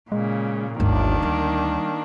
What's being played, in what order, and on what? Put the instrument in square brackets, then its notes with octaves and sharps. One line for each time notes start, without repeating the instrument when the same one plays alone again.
[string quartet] A#2 C#3 [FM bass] G#3
[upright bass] G1 [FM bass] D2 [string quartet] D#3 A#3 D4
[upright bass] G3